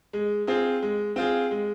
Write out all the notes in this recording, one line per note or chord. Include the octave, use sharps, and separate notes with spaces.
G#3
C4 F4 G#4
G#3
C4 F4 G#4
G#3